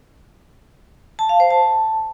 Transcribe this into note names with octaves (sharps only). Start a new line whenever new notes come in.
A5
F5
C5
A5